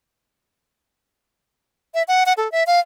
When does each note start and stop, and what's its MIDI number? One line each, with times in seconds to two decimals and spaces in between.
1.94 2.03 76
2.08 2.24 78
2.26 2.33 78
2.37 2.50 69
2.52 2.63 76
2.67 2.80 77